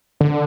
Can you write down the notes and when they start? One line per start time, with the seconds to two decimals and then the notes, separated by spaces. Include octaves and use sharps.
0.21 D3